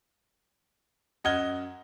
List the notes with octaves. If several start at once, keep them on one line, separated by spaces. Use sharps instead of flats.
F#2 D#5 F#5 F6 G#6 G7